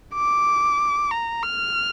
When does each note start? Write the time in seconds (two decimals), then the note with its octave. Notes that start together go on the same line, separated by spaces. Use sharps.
0.15 D6
1.11 A#5
1.43 F6